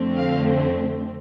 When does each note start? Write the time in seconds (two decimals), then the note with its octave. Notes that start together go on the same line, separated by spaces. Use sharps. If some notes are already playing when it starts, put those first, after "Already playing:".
Already playing: F2 D3 F3 A3 C4
0.16 F5